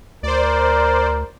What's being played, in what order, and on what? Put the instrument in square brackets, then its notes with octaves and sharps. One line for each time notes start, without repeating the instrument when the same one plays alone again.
[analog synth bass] D2 [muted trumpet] A#4 [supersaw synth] C5 D5